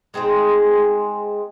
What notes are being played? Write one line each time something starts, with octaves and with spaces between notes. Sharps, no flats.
G#3 C4 D#4 G#4